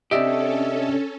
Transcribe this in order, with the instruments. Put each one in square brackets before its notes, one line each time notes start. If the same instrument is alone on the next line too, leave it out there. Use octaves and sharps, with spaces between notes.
[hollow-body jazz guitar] C3 D4 G4 [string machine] C#4 A4 [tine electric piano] D#5 E5